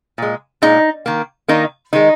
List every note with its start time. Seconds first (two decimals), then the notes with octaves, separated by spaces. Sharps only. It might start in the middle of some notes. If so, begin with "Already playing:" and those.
0.18 A#2 G#3
0.62 A#2 G#3 D#4
1.06 D#3 A#3
1.48 D#3 A#3 D#4
1.93 D#3 G#3 D#4